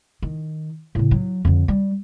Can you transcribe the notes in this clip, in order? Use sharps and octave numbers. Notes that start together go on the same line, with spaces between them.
D#3
A2 C#3
F#3
F2 D3
G3